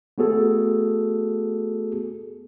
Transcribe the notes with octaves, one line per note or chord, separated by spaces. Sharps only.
A3 B3 F#4 G#4 A4